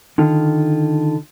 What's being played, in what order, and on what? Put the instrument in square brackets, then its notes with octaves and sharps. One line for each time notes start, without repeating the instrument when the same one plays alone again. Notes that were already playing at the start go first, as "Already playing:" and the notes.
[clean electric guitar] D3 D#3 F4